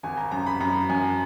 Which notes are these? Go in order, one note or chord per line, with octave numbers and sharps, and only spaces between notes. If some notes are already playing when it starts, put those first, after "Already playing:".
G#1 G#5
A#5
F#2 A#5
B5
F#2 A#5
F#2 G#5